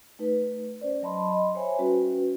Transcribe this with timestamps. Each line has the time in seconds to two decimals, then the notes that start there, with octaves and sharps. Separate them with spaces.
0.19 A3 D#4 B4
0.81 C#4 C5 D5
1.02 F#3 D#5 A5 B5 C6
1.31 D#5 B5
1.55 C5 C#5 E5 G#5
1.78 G3 C#4 F#4 B4